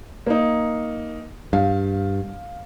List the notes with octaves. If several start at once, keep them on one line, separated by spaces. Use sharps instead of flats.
A#3 D#4
G2 F5